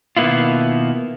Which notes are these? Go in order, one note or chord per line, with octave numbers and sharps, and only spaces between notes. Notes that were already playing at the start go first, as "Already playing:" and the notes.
B2 D#3 A#3 B3 E4 F4